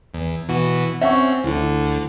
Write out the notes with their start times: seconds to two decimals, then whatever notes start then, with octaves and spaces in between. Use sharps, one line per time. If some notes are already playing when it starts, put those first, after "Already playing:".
0.14 E2
0.49 B2 E3 F#4
1.01 C4 C#4 E5 F#5 C#6
1.44 D2 D3 E4